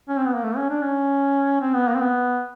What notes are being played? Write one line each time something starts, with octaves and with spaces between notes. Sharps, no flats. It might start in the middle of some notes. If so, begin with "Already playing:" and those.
C#4
C4
B3
A#3
A3
C#4
D4
C#4
C4
B3
A#3
C4
B3